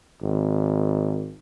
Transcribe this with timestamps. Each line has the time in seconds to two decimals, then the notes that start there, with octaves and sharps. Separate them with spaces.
0.23 G#1